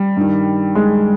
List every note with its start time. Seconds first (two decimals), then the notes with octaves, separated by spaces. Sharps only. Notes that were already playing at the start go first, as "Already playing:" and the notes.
Already playing: G3
0.17 G2 D#3
0.75 G#3